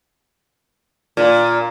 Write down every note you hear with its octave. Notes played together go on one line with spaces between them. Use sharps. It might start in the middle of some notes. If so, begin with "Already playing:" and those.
A#2